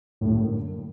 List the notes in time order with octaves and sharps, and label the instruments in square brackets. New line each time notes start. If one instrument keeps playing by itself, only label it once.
[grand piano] F#2 D3 G3 A#3 [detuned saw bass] A2